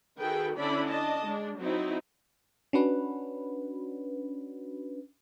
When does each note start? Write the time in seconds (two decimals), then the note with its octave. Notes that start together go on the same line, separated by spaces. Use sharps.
0.20 D#3 F#4 G#4 A4 B4 G5
0.58 D3 C#4 D4 E4 D5 B5
0.88 D4 D#5 A5
1.25 G#3 D4
1.59 F#3 C4 D#4 E4
2.73 C#4 D4 F#4 B4